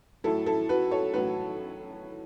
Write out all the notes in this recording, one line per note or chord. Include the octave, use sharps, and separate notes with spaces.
A2 F#3 E4 A4
E4 A4
F#4 B4
A4 C#5
A2 F#3 F#4 B4